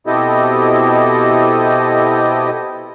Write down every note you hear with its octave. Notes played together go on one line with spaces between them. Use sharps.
B2 C4 E4 G4 A4 D#5